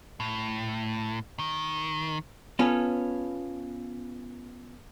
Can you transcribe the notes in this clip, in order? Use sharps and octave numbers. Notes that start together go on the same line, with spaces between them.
A2
D#3
B3 C#4 F4 A4